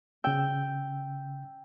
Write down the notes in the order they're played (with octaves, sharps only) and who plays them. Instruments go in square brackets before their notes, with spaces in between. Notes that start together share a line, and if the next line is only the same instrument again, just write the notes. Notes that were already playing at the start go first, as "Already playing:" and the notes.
[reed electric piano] C#3 E6 [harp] G5